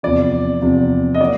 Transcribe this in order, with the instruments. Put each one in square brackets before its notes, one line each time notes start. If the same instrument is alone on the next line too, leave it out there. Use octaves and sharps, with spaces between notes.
[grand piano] E2 C3 F3 D5
E2 C3 F3
D#5
F#3 A#3 D5